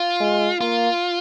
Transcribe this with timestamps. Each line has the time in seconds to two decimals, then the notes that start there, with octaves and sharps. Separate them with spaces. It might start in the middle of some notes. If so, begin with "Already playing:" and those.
Already playing: F4
0.20 G#3
0.61 A#3 F4